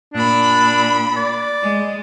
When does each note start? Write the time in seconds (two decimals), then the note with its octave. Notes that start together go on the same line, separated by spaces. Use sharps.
0.14 A#2 D4 B5
1.17 D5
1.63 G#3